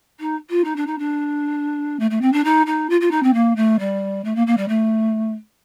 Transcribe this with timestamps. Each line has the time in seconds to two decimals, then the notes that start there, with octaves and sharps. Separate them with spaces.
0.20 D#4
0.49 F4
0.64 D#4
0.76 D4
0.86 D#4
0.98 D4
1.99 A3
2.10 A3
2.21 C4
2.32 D4
2.44 D#4
2.66 D#4
2.89 F4
3.00 F4
3.11 D#4
3.23 C4
3.33 A#3
3.56 A3
3.79 G3
4.24 A3
4.35 A#3
4.47 A#3
4.57 G3
4.68 A3